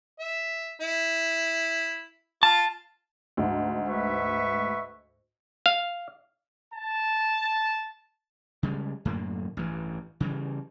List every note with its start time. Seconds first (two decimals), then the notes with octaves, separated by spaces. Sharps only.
0.20 E5
0.81 E4
2.43 F4 A5
3.37 D2 G#2
3.88 B4 E5 C#6
5.66 F5
6.74 A5
8.63 C#3 G3 G#3
9.05 F#2 A2 D3 A#3
9.57 A1 G2 E3
10.20 C#3 E3 G3